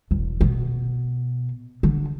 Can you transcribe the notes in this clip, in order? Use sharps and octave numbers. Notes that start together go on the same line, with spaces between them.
E1
B2
D3